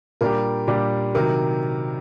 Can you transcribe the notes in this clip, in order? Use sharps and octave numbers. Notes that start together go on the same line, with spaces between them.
A#2 G3 D4 G4 A#4
A#2 G3 D4 G4
C3 D#3 F#3 A#4